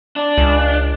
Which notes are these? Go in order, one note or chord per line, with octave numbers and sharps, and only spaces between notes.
D4
C#2